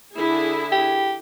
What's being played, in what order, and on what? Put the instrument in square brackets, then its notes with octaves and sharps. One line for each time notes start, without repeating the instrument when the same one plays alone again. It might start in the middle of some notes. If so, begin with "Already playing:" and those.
[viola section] D3 E4 G#4
[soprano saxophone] G4